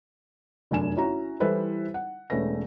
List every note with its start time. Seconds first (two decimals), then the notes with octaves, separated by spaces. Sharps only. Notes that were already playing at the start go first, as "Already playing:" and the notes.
0.71 F1 F#2 D4 G#5 E7
0.97 C#4 E4 F#4 A#5
1.40 E3 G3 E4 A4 B4 C5
1.94 F#5
2.30 E1 A3 C#4 B4 A#6